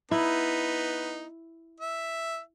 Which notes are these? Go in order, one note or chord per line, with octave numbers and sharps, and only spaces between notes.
B3 D#4 E4
E5